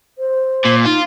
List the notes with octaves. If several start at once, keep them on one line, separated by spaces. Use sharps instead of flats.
C5
A#2
D#4 F4